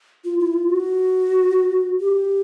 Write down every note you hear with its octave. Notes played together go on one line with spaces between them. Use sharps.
F4
E4
F4
F#4
G4